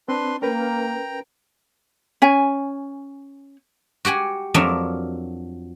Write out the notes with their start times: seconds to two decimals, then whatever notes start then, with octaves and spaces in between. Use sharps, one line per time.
0.09 C4 D4 B4 C6
0.42 A#3 C#4 A#4 B4 G5 A#5
2.22 C#4 G#5
4.05 F#4 G4 F#5 G#5
4.54 F2 F#3 D4 F4 A#4 E5